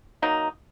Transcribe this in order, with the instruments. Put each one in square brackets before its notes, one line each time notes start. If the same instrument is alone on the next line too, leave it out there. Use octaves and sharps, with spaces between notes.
[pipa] D#3 F#3 A#3 D#4